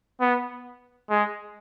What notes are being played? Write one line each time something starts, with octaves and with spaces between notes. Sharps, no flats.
B3
G#3